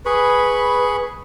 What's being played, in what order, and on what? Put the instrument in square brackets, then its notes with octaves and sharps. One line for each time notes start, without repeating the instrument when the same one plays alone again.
[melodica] G#4 B5 C#6 [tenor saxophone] B4